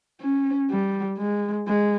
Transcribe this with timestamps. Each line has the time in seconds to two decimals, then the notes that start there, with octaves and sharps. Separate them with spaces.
0.21 C#4
0.70 G3
1.18 G#3
1.68 G#3